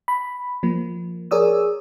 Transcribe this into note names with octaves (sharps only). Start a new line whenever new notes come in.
B5
F3 A#3
G#4 A#4 C#5 D5 D#6 E6